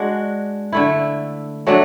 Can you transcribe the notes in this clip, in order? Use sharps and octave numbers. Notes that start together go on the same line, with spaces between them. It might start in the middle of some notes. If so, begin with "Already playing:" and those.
Already playing: G#3 D4 F#4
D3 A3 E4
F#3 A3 D4